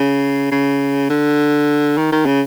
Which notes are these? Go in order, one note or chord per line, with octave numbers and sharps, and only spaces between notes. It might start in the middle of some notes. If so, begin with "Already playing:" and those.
Already playing: C#3
C#3
D3
D#3
D#3
C#3